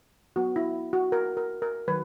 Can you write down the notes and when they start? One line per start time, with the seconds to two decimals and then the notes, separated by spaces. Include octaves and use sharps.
0.36 F#3 B3 F#4
0.56 E4
0.93 F#4
1.12 A#4
1.37 A#4
1.62 A#4
1.88 D#3 F#3 B4